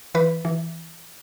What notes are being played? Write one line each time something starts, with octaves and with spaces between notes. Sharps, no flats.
E3 B4
E3